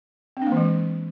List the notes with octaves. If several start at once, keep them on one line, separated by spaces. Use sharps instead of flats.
C4
D4
A#3
E3
G#3